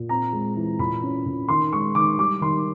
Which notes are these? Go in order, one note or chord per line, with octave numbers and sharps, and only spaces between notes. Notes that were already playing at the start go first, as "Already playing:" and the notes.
Already playing: A#2
C4 A#5
G#3
E3
A#2 B5
C#4
A#2
D#3 C6
G#3 C#6
D#3 D6
G3 D6
D#3 C6